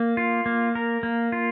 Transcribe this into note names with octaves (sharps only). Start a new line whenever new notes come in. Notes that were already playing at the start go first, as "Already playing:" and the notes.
Already playing: A#3
F4
A#3
A#4
A#3
F4